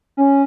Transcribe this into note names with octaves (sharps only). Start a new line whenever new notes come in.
C#4